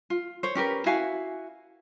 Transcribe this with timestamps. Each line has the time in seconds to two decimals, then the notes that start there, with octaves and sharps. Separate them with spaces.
0.10 F4
0.43 C5 C#5
0.55 C#4 G4 A#4 B4
0.86 E4 F#4 F5 G#5